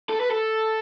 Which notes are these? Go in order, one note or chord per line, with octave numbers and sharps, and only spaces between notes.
A4
B4
A4